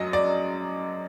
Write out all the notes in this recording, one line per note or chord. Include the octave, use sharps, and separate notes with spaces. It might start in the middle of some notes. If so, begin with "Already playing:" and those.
Already playing: F#2 F#3 D#5
D5